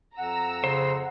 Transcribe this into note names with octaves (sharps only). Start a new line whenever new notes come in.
F2 F#5 A#5 E6
C#3 C5